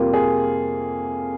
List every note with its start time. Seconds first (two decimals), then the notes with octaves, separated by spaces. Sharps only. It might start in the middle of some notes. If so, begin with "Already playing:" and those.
Already playing: F2 C3 G3 A#3 F4
0.13 G#4